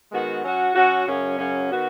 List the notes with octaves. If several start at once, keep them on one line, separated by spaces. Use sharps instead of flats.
D#3 G#3 B3 F#4
F#3 C#4 F#4
F#3 C#4 F#4
F#2 C#3 F#3 C#4
F#2 C#3 F#3 C#4
D#3 B3 F#4